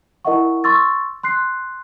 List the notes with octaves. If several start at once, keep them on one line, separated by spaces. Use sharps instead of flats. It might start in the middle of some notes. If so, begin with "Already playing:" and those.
E4 A#4 D#5 E5 F#5 C#6
C6 C#6 E6 A6
C6 F#6 C7